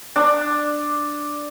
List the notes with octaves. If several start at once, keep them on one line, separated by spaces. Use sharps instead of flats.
D4